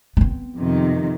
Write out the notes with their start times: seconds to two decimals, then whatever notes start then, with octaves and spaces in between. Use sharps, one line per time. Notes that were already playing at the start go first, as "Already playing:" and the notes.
0.17 B3 C4
0.57 F2 C3 D#3